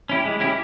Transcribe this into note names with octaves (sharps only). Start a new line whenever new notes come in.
C#4 E4 G4
G#3
C#4 E4 G4